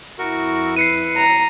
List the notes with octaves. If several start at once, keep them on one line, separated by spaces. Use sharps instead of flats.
F2 E4 F#4 A#4 C#6
B4 C7 C#7 D#7
A#5